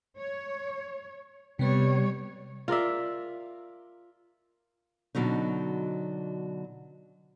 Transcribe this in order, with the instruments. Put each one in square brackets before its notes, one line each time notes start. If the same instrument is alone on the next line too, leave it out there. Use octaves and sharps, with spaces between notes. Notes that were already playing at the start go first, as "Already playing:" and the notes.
[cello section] C#5
[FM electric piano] C3 B3 [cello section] G3 C#5
[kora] F4 A#4 D5 E5
[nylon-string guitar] B2 D3 F#3 C#4 D#4